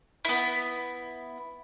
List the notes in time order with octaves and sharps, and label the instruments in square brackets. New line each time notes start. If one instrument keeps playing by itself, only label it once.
[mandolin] B3 E4